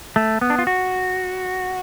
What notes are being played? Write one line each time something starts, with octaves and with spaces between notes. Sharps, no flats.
A3
B3
D4
F4
F#4